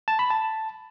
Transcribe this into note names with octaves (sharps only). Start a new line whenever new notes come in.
A5
B5
A5